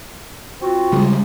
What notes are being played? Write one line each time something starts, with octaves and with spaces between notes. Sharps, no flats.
C4 F4 F#4
C#3 G3 G#3